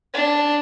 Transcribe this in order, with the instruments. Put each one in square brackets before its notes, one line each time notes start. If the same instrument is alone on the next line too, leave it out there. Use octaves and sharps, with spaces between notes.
[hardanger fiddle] D4